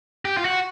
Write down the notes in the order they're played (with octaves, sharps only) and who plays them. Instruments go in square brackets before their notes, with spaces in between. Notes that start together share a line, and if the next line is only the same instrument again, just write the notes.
[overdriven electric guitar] G4
F4
F#4